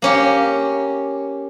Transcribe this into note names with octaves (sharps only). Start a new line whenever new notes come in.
A#3 C#4 G4